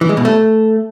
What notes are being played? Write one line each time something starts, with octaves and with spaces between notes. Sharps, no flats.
E3
G#3
B2
A3